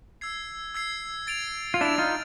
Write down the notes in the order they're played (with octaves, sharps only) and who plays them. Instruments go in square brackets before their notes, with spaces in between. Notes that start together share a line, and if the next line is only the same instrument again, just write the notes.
[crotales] E6 G#6 C7
E6 G#6 C7
A6 D7 F7
[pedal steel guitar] F4
[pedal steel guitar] D4 E4 [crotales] A6 D7 F7
[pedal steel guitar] D#4 F4